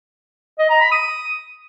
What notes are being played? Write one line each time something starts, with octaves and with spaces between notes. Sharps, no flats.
D#5
A#5
B5
D#6